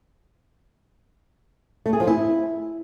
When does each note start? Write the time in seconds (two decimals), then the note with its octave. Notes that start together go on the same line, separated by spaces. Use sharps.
1.86 A3
1.93 G#4
2.00 F3
2.07 E4